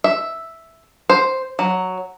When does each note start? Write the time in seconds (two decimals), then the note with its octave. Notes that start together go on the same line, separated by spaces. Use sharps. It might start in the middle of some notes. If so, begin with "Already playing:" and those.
0.04 E5
1.10 C5
1.59 F#3